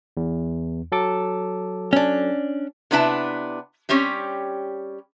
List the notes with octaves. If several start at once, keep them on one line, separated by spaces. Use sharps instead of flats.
E2
F#3 A4 D6
C#4 D4
C3 B3 D4 E4 B4 A5
G3 C4 C#4 G4 C#5